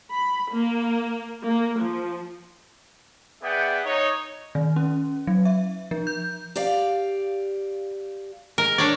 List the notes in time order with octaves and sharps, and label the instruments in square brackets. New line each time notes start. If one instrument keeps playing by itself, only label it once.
[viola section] B5
A#3
A#3
F3
[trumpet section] B3 G#4 D5 E5 F#5 G5
D#4 C#5
[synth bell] D#3
C#4
F#3
E5
F3
G6
[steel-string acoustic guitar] G4 D5 F5
[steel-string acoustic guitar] G#3 [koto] A#4
[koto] D4 C#5 D5